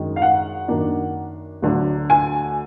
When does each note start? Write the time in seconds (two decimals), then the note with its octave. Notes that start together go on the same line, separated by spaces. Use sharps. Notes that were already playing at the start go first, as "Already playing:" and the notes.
Already playing: F#2 D#3 G#3 D4
0.16 F5
0.22 F#5
0.68 F#2 D#3 A#3 D4
1.62 D2 D3 F#3 D4
2.10 G#5